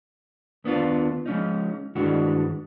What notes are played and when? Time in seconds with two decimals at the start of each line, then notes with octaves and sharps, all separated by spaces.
0.64 D#2 B3 D4 F4
1.26 F3 G#3 C#4 D#4
1.95 G2 D#3 E3 G#3 D4 F#4